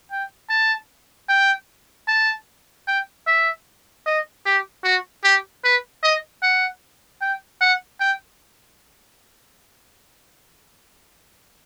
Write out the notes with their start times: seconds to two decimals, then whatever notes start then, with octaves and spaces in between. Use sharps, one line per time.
0.11 G5
0.50 A5
1.29 G5
2.08 A5
2.87 G5
3.27 E5
4.06 D#5
4.46 G4
4.84 F#4
5.24 G4
5.64 B4
6.03 D#5
6.43 F#5
7.21 G5
7.61 F#5
8.00 G5